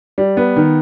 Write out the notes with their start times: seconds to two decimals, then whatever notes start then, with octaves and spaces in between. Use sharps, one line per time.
0.18 G3
0.37 B3
0.56 D#3